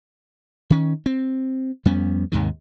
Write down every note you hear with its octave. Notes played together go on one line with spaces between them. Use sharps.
D#3 C#4
C4
F2 G3 B3 C#4
D#2 G#2 C3 D#3